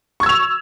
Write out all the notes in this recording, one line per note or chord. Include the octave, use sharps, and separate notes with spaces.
C#6 E6 G#6 F7